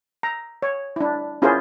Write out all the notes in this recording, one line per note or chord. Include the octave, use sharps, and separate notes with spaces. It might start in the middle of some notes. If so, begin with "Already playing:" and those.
A#5
C#5
D4 E4
C#4 E4 F4 G#4 A#4 C5